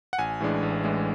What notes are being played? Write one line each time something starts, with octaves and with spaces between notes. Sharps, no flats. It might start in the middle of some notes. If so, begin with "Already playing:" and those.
F#5
A1 G#5
A2 E3 G#3 D4
A1
A2 E3 G#3 D4